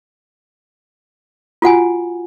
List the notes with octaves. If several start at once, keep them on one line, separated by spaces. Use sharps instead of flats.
F4 F#4 F#5 G#5